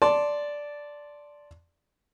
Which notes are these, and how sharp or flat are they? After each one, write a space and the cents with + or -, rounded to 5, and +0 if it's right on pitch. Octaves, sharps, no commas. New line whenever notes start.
D5 -5 A5 +0 C6 +0